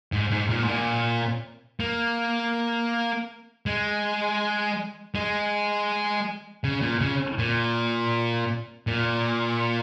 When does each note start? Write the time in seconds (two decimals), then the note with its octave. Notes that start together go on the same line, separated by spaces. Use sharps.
0.12 G#2
0.31 G#2
0.50 A#2
0.63 G#2
0.68 A#2
1.80 A#3
3.66 G#3
5.15 G#3
6.64 C#3
6.82 A#2
7.01 C#3
7.38 A#2
8.87 A#2